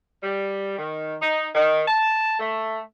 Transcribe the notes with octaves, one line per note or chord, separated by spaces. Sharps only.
G3
D#3
D#4
D#3
A5
A3